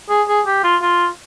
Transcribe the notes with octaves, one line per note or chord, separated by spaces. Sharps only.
G#4
G#4
G4
F4
F4